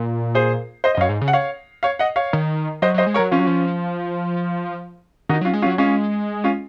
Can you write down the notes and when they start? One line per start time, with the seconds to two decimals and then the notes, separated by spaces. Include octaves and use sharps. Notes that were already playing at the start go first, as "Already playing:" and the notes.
Already playing: A#2
0.35 G#4 C5
0.84 C5 D#5
0.95 D#5
0.97 F#2
1.01 C#5 F5
1.09 G#2
1.21 C#3
1.28 F#5
1.33 C#5 F5
1.83 C#5 F5
1.99 D#5 F#5
2.16 C#5 F5
2.33 D#3
2.82 F#3 C5 D#5
2.94 F#3
2.98 C5 D#5
3.07 G#3
3.14 A#4 C#5
3.19 F#3
3.31 F3 C#4 F4
3.39 F#3
3.47 F3
5.29 D#3 D#4 F#4
5.41 F#3
5.45 C#4 F4
5.54 G#3
5.62 C#4 F4
5.66 F#3
5.78 G#3 C#4 F4
6.44 C#4 F4